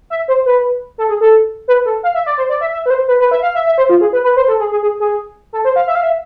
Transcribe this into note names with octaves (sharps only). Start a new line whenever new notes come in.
E5
C5
B4
A4
G#4
A4
B4
A4
F5
E5
D5
C5
D5
E5
E5
B4
C5
B4
B4
E5
F5
E5
E5
C5
F4
G#4
B4
B4
C5
A4
G#4
G#4
G#4
G#4
A4
C5
F5
E5
F5
E5